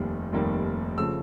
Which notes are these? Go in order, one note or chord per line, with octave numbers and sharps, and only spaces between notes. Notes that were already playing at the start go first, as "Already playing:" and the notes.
Already playing: F1 D#2 D#3 G3 A#3
F1 D#2 D#3 G3 A#3
C#3 F3 A3 E6